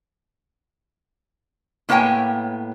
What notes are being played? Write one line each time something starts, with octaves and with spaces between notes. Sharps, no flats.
A2 A#3 B3 C#5 G5 G#5